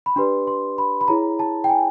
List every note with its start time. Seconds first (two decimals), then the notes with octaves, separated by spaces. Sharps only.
0.06 B5
0.16 D4 G4 B4 D5 C6
0.47 C6
0.78 B5
1.01 B5
1.08 E4 G#4 C#5 A#5
1.39 A5
1.64 G5
1.69 G#5